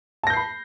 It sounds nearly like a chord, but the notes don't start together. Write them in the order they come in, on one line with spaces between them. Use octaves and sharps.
A5 A#6 G6 C7 B5